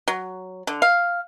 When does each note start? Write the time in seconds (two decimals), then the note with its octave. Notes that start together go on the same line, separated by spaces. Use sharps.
0.08 F#3
0.67 D3
0.82 F5